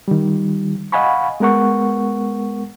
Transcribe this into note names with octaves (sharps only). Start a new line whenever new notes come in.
D#3 G3
D#5 F5 F#5 G#5 B5 C#6
G#3 B3 A#4 F#5 C#6